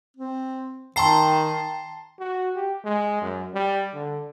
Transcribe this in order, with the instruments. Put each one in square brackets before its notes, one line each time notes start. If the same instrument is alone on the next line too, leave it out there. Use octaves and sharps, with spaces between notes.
[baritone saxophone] C4
[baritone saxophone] D#3 [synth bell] G5 A#5 C7 [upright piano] A5 C6
[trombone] F#4
G4
G#3
F#2
G3
D3